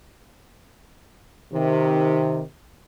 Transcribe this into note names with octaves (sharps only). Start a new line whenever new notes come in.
C3 D#3